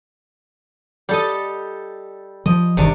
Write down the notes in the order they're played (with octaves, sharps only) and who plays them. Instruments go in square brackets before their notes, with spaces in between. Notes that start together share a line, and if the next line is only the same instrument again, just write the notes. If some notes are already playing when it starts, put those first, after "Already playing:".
[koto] G3 A4 D#5
[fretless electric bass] F3 [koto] D#5
[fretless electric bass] G1 D#3 [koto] C3 D4